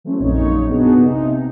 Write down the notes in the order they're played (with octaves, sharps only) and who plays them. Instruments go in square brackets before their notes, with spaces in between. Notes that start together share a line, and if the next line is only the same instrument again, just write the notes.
[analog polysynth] E3 F#3 A3 C4 C#4
A#1 F#2 A#2 D#4 C#5
B3 D4 D#4 F#4 G#4
C3 D#4